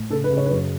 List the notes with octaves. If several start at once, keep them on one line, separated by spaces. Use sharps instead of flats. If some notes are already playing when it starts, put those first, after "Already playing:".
Already playing: A2
C#3 A4
B4
C#3
C#5
B4
F#2 C#5